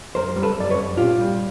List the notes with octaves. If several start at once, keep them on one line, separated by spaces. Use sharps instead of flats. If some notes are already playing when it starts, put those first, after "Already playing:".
F#2 A#4 C5
G3
A4 B4
F#2 D5
B4 C#5
F#2
A#2 F4 G4
G3